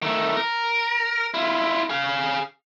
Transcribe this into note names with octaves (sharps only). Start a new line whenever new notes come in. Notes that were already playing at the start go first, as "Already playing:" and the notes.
D#3 A3
A#4
E4 F4
G#4 F5